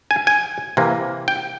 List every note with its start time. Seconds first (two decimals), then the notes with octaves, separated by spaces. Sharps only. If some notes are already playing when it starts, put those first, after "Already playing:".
0.11 G#5
0.27 G#5
0.77 C3 E3 A#3
1.28 G5